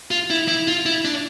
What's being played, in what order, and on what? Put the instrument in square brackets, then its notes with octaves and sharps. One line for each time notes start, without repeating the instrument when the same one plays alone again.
[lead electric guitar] F4
E4
E4
F4
E4
D4